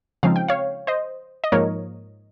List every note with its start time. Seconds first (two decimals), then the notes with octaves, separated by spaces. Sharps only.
0.23 C#3 F3 G#3 C4 D#4 F5
0.36 G5
0.48 C#5 F5
0.87 C5 D#5
1.44 D#5
1.52 G#2 F3 A#3 A#4 C#5